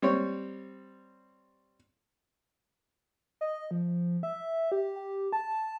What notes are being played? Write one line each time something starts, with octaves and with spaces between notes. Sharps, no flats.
G3 C4 C#5
D#5
F3
E5
G4
G4
A5